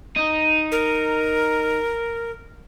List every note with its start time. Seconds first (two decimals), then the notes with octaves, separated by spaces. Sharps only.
0.16 D#4
0.72 A#4